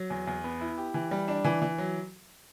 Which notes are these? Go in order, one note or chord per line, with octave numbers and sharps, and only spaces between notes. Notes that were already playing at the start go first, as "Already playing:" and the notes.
Already playing: F#3
E2
E2
B3
E4
G4
E3
G3
D4
E3
E3
F#3